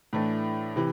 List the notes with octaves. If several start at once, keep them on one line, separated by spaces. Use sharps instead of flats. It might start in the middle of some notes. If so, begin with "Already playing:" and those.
A2 E3 A3 D4
C3 E3